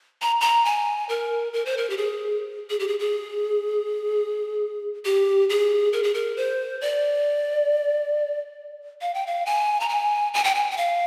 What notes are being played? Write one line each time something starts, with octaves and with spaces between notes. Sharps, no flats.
A#5
A#5
G#5
A#4
A#4
C5
A#4
G4
G#4
G#4
G4
G#4
G#4
G4
G#4
A#4
G#4
A#4
C5
D5
F5
G5
F5
G#5
A#5
G#5
G#5
G5
G#5
G5
F5